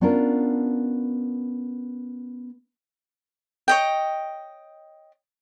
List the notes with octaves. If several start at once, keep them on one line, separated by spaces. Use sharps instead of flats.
B3 C#4 D4 F4 A#4
C#5 D#5 G5